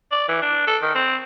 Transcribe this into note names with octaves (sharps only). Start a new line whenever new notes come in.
D5
E3
D4
A4
D#3
C4